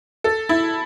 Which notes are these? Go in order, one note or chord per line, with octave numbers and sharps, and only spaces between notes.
A4
E4